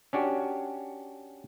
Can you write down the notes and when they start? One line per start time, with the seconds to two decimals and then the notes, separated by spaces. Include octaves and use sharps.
0.13 C#4 D4 F#4 G4